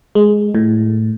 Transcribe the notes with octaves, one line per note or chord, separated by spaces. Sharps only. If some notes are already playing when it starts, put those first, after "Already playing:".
G#3
A2